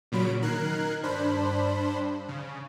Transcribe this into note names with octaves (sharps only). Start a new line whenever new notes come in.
A#2 C#3 F#3 B5 D7
D#3 A#4 F#6 G#6 C7
G2 D4 C5 B5
C#3